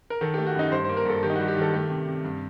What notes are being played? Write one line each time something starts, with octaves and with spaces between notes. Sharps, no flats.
A#4
D#3 A4
A3 G4
F#4
F#2 D#4
G2 C5
A#3 C5
A#4
G2 A4
D#3 G4
D#4
G3 F#4
G4
D#3 A4
A3 G4
C3
C3
G2